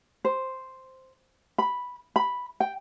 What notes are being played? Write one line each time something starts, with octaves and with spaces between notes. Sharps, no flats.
C5
B5
B5
G5